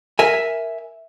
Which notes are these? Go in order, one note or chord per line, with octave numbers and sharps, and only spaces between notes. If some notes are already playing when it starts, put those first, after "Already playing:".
A#4 E5 G#5